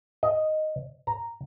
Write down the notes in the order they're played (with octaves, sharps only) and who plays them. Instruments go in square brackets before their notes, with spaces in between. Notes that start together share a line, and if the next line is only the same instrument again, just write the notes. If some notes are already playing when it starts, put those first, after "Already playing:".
[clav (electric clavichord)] D#5
A#5